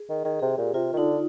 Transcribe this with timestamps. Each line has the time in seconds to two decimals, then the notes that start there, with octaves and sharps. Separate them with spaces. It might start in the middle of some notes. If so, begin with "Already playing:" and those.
Already playing: G#4
0.09 D#3
0.25 D#3 G#4
0.39 C3 G#4
0.50 G4
0.58 A#2
0.74 C3 F4
0.93 D#3
0.97 D3 D#4